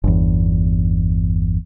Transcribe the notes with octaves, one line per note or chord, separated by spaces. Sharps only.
G1 E2